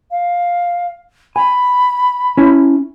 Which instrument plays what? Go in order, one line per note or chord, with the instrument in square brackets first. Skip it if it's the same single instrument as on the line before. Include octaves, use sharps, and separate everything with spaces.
[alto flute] F5
[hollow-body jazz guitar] G#5 [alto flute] B5
[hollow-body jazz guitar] C#4 E4